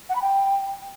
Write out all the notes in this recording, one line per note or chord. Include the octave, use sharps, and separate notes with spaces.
F#5
B5
G5